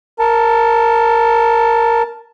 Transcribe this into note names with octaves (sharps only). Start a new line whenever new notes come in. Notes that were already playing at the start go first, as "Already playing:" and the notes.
A#4 A5